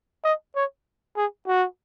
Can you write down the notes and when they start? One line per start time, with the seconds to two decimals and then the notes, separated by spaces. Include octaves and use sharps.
0.24 D#5
0.56 C#5
1.17 G#4
1.47 F#4